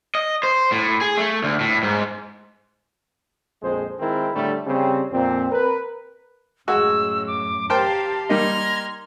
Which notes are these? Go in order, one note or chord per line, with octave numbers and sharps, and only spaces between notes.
D#5
C5
A2
G#4
A3
D2
A2
G#2
A#1 F2 G#3 C5
D#3 G#3 C4 E4 A#4
A2 D3 G3 A3
C#3 G3 C4
F2 A#2 C4
A#4 B4
F#2 A2 G#3 F#4 E6
D6
G4 A#4 C5 F5 G5 A5
G3 A#3 D#4 C6 F6 G#6 A#6